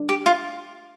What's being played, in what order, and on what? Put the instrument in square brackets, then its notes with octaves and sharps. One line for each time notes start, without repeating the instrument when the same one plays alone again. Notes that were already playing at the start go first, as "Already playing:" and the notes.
Already playing: [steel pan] D4
[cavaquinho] G4
F4